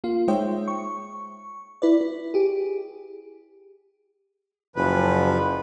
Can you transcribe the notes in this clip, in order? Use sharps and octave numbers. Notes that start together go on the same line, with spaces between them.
A#3 F4
G#3 D#4 C5 C#5 E5 G5
C#6
E4 B4 D5
E4
G4 G#4
F#1 F#2 F3 B4